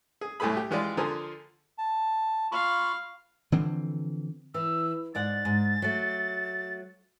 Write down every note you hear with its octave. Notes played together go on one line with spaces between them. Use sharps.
G#4
C2 A2 A3 G#4 B5
G4
E3 F3 G#3 F4 G4 D5
D3 F3 G#4 A#4 C5
A5
F4 F5 B5 C#6
D3 E3 F3 C4
E3 E6
G#2 D5 F#5 A6
G#2
F#3 A3